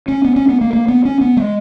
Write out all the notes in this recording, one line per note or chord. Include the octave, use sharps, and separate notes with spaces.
C#4
B3
C#4
B3
A#3
A#3
B3
C#4
B3
G#3